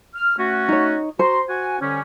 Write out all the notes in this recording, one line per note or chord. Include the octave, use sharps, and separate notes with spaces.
F6
A3 C#4 F#4
D#4 C#5
F#4 C5 A#5 C6
F#4 F#5 G#5
D3 G3 C#4